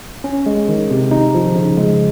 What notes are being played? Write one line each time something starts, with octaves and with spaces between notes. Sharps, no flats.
C#4
G#3
D#3
C3
D#4
F3
C#3
G#3